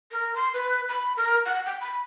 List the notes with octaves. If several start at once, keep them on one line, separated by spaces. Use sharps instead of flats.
A#4
C6
B4
B5
A#4
F#5
G5
B5